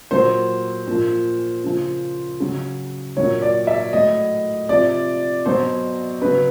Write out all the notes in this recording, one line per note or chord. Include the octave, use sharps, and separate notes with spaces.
A#2 F#3 C5
A#2 F3
C#3 F3
C#3 F#3
A#2 F#3 C#5
D5
E5
A2 F#3 D#5
C3 F3 D5
B2 F#3 C5
C#3 F#3 B4